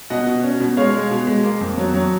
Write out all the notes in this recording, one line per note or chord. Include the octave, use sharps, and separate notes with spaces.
B2 D#5 F#5
B2
C#4
B2
G#3 C#5 F5
G#3
B2
G#3
A#3
F2
F#3
F#3